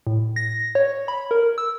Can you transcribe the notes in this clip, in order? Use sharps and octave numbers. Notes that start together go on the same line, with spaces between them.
A2
A#6
C#5
B5
A#4
E6